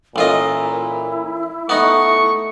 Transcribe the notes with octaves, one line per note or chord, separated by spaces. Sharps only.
A1 A#2 E4 F4 D#5
A3 B3 D#4 C#6